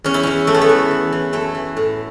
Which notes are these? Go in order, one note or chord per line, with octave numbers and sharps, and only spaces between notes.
E2 C#4
E4
E2 C#4
E3 A3
B3
A3
E3
E3
E3
F#2 A3
E3
A2